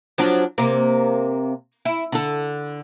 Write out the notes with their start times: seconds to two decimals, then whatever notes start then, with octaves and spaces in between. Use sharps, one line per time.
0.18 F3 F#3 D4
0.58 C3 A#3
1.85 E4
2.12 D3 A4